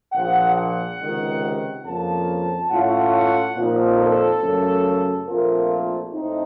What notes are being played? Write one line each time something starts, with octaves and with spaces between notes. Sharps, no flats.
A#1 A#2 F3 F#5
F#5
C#2 C3 D#3
F2 C#3 F3 A#3 A5
A2 A3 C#4 F4 F#5
F#5
A#2 F3 C4 D#4
A4
F#2 C#3 A3
A#1 A#2 A3 C4 F4 A#4
A2 A3 C4 D#4